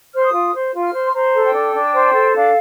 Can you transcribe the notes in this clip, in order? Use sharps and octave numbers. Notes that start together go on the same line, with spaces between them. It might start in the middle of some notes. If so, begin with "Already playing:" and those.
C5 F6
D#6
F4
C5
F4
F6
C5
C6
C5 A#5
A4
G5
D4
D4
C5
A4
D4 F5